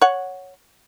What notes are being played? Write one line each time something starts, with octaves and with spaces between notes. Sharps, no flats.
C#5 F#5